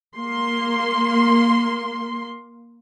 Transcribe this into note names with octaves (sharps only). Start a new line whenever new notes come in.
A#3 C6